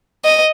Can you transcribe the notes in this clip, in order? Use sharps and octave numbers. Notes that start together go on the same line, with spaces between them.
D#5